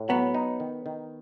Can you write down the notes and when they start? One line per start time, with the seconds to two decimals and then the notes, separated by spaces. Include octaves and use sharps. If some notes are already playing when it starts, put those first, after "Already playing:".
Already playing: A2
0.09 F#3 B3
0.35 D#4
0.60 D#3
0.86 D#3